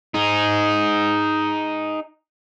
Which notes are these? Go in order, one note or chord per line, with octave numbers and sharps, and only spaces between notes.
D#4 G#4